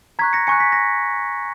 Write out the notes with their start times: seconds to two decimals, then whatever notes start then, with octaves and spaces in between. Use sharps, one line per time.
0.19 A#5 C#6 F#6 G#6 B6
0.33 A#6 C#7
0.47 G#5 C#6 F#6 C#7
0.60 B6
0.72 A#6